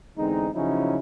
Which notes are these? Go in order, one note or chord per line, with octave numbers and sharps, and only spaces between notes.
E2 D3 G#3 C4 D#4
C#3 F3 F#3 C#4 D#4 E4